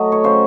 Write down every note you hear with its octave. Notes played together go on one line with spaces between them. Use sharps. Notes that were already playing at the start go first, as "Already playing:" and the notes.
Already playing: F#3 A3 D#5
C#5
C#3 C5